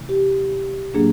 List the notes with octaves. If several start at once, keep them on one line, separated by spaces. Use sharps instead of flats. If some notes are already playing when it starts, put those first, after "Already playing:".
Already playing: C3 E3 A3 C#4 E4
G4
A2 F#3 A#3 D4 G#4